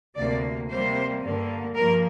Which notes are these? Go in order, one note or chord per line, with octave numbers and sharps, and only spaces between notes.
D2 C3 A#3 D5
C3 G3 A#3 C5
G2 D3 A#3
G2 F3 A#3 A#4